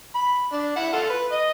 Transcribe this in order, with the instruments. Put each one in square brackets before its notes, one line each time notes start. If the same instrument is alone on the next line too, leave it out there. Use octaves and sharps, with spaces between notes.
[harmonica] B5
D4
E4 F#5
F4 A4 A5
B4
D#5